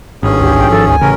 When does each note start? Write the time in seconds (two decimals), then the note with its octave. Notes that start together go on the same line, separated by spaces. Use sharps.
0.23 G#1 G2 C#4 G#4
0.41 D2 G4
0.59 B1 G5
0.70 F3 A4
0.89 D2 G#5
1.01 A1 C#3 C#4 A#4